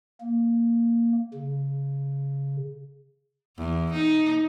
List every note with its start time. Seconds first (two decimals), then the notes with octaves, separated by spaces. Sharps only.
0.20 A#3
1.34 C#3
3.57 E2
3.93 D#4